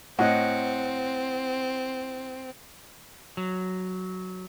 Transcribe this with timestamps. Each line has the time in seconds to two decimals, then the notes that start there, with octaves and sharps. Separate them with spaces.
0.19 A2 C4 D#5 F#5
3.37 F#3